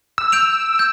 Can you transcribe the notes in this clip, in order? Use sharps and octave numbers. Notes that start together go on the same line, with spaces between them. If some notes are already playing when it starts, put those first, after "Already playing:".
E6
G6 D7 F7
G6